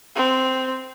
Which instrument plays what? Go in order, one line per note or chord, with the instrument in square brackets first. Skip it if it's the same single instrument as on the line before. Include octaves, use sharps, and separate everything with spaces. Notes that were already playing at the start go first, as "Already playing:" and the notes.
[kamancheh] C4